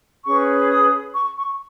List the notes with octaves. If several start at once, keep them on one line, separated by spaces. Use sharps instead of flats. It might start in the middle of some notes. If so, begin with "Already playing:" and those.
C#4 G#4 B4 C#6
D#6
C#6
C#6